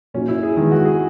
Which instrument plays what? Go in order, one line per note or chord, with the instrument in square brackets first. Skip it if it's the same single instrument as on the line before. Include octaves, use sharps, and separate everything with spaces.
[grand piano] A#2 F#3 A#3 D#4 [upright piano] C#4
[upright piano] E4
G#4
[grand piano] D#3 G#3 B3
[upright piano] F#4
G#4